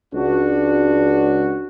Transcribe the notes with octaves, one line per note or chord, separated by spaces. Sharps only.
C#2 D4 F#4